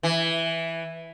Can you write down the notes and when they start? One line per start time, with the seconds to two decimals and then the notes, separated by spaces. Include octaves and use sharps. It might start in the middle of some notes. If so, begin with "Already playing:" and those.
0.03 E3